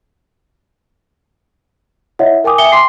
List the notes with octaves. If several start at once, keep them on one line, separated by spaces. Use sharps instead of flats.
E4 C#5 D#5 E5 F#5
A#4 G5 G#5 D6 D#6
E5 G#5 C#7 G7
G5 C6 D6 C7